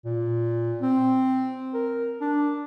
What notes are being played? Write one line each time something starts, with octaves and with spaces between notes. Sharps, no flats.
A#2
C4
A#4
D4